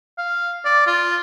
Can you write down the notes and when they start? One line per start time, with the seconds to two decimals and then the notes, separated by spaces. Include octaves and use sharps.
0.18 F5
0.65 D5
0.87 F4